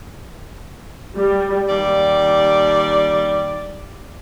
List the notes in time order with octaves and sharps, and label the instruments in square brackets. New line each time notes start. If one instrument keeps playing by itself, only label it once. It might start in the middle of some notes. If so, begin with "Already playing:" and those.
[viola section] G3
[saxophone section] D#2 G3 D5